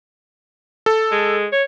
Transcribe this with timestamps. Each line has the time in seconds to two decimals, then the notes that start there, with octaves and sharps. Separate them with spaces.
0.86 A4
1.12 G#3
1.52 C#5